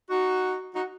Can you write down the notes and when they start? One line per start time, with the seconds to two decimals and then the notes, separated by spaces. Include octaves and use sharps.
0.10 D#4 F#4
0.74 D#4 F#4